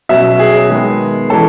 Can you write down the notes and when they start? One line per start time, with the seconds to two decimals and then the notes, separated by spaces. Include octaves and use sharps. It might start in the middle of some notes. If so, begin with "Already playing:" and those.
0.09 B2 F#3 C#4 E5
0.39 G#4
0.70 D#3 G#3 B3
1.29 E3 G#3 C#4 A4